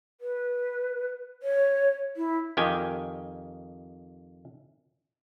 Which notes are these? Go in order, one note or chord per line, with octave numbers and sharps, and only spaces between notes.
B4
C#5
E4
F2 D#3 G4 G5 G#5